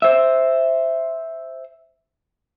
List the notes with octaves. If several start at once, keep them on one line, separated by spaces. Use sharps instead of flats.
C5 E5